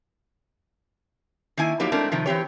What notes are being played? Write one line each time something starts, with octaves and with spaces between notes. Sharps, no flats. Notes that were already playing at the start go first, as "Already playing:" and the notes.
D#3 A#3 E4 G#5
F3 F#3 A#3 D#4 E4 G4
G#3 A3 C4 D4 A#4
C3 D#3 F3
E3 C4 G4 C#5